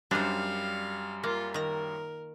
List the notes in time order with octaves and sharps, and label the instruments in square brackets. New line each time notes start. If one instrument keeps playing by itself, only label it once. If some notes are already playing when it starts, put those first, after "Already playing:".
[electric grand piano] F#2 G3 [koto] D4 D#4 C5 [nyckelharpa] F5
[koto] A#3 [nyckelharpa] F4
[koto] D#3 A#5 [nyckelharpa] A#4